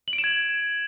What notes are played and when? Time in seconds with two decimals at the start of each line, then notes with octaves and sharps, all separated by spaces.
0.08 F#7
0.13 D7
0.18 E7
0.24 G#6